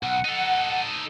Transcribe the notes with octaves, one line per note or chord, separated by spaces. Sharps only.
B1 F#5
D#4 A4